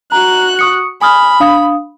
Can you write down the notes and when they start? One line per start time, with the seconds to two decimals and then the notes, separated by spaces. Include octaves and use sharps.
0.12 F#4 A#5 F#6
0.59 C#6 D#6 C#7
1.01 G#5 B5 D#6 F6
1.40 D4 F5 D#6